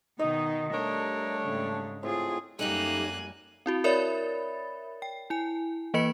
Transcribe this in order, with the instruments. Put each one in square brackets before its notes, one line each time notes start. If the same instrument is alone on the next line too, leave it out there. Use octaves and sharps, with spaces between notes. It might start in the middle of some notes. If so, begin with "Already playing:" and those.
[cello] B2 D#3 [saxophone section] D#4 [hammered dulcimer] D#5
[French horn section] G3 A3 [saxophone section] D4 C#5 [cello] A#4
[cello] G#2 C#3
[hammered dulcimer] A2 C4 [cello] F4 G#4
[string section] F#2 G3 [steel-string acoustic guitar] A3 D#4 G4 [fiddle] A#3 F#6 [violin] G#5
[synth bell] C4 E4 F#4
A#4 C#5 D5 E5 B5 A6
G5
E4 G#5
E3 A#3 B4 D#5 B5 C#7